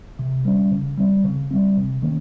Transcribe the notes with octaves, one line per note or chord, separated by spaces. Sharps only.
C3
G3 C#4
C#3
G3 C4
C#3
G3 C4
C3
D#3 A#3 C#4